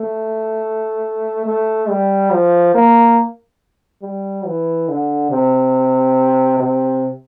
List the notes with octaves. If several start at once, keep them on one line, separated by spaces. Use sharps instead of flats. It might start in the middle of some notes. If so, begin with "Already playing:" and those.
Already playing: A3
A3
G3
F3
A#3
G3
E3
D3
C3
C3